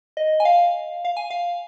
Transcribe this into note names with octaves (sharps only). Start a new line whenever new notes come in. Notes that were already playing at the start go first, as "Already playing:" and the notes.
D#5
G#5
F5
F5
G#5
F5